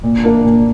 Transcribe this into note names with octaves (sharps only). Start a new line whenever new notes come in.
A#2
A#3 D4 A#4
A#2